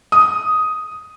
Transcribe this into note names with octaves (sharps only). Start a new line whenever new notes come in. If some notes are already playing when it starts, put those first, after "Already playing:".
D#6